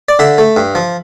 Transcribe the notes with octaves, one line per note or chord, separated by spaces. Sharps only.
D5
D3 E5
A3
G2
F3